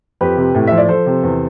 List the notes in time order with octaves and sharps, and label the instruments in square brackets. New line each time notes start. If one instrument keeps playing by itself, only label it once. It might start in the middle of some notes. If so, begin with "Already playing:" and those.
[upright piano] F2 G4 B4
C3
A2
F3 E5
D5
F3 A4 C5
C3
E2